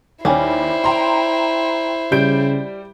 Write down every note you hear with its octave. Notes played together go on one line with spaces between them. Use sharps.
D#2 G3 C#4 E4 C5
G5 A#5 C6
C#3 G3 G6 D7